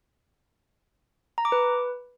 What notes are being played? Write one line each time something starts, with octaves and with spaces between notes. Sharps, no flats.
A#5
D6
B4